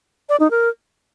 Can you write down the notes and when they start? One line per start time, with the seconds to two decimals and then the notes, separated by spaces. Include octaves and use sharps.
0.29 D5
0.40 D#4
0.51 A#4